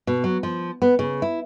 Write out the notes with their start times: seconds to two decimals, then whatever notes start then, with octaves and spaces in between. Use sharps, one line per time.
0.07 B2
0.24 F#3
0.43 F3
0.82 B3
0.99 C#3
1.22 E4